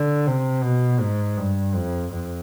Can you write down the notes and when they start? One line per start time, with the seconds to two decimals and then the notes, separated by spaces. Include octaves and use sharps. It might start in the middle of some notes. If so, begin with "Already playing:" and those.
Already playing: D3
0.26 C3
0.63 B2
0.99 G#2
1.37 G2
1.75 F2
2.11 F2